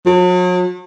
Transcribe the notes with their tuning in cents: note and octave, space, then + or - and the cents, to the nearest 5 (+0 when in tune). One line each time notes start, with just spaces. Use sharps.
F#3 -40